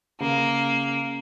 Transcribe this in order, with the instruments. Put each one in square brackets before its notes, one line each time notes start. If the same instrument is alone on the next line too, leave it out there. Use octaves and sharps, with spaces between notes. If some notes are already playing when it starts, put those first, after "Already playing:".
[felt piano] C#3 [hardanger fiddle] A#3